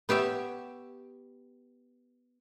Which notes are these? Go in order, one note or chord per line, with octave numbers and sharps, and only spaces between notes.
B3 G4 C#5 E5